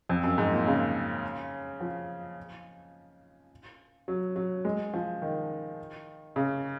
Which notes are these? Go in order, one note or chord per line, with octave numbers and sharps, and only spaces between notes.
F2
F#2
G#2
A#2
C#3
F3
F#3
F#3
G#3
F3
D#3
C#3